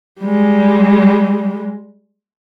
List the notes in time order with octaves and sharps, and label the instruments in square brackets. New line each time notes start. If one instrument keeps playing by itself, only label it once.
[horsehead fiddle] G3 G#3